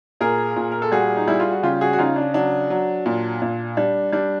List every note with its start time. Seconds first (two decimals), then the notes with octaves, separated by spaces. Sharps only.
0.21 A#2 G#4 A#4
0.56 A#2
0.72 A#4
0.82 A4
0.92 G3 F#4 G#4
1.17 D#4
1.28 G3 E4
1.40 F4
1.52 F#4
1.63 C#3 F4 G4
1.81 F#4 G#4
1.93 F#4
1.99 C#3 D#4 F4
2.16 D4
2.34 F#3 D4
2.70 F#3
3.06 A#2
3.42 A#2
3.77 G3 D4
4.13 G3 D4